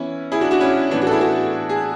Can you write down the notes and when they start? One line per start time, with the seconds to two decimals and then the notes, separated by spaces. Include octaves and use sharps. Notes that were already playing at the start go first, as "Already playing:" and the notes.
Already playing: E3 B3 C#4 E4
0.32 E4 G#4
0.41 D4 F#4
0.51 D4 F#4
0.61 C#4 E4
0.91 A2 E3 B3 D4
1.01 D4 F#4
1.07 A4
1.11 E4 G#4
1.21 F#4 A4
1.69 G#4